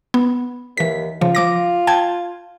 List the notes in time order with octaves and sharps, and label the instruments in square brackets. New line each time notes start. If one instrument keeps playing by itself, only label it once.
[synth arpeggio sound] B3
[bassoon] D#2 [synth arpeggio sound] E3 B6
[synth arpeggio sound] C#3 F3 [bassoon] F4
[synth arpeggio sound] F3 D6 A#6
G5 A5 G#6